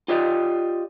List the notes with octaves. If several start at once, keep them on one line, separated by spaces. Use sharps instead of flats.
F4 G4 D5 D#5